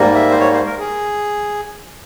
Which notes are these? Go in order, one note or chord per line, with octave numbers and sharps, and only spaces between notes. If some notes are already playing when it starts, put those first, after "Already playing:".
Already playing: G#2 G3 A#3
E5
C5
C#5
C5
A#4
G#4